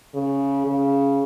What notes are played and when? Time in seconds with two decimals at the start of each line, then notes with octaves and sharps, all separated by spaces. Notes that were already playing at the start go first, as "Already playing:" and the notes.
0.15 C#3
0.67 C#3